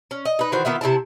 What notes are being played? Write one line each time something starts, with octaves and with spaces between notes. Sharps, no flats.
C#4
D#5
D#4 B4
D#3 E3 F#4 C5
D#3 B3 F4 E5
C3 D4 E4 A5